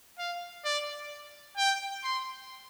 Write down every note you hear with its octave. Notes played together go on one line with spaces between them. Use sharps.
F5
D5
G5
C6